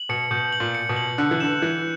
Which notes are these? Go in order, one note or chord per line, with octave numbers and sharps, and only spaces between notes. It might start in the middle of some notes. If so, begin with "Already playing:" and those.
Already playing: F#7
B2 C#7
B2 G6
F#7
A#2
C#7
B2
F#7
D3 F#6
E3
D3 E7
E3 F#6